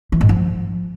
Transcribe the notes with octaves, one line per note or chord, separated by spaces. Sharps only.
E3
G#2
F3